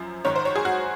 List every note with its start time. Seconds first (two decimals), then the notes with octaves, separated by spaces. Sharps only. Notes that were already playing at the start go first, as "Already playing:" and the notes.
Already playing: F#2 F3
0.25 G#2 D#3 C#5
0.36 C5
0.45 C#5
0.56 G#4
0.65 F#4